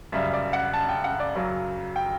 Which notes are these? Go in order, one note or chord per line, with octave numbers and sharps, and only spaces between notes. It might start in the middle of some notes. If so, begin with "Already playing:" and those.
F#2 C#3 G3 E5
D5
F#5
A5
G5
F#5
D5
F#2 C#3 F#3
G5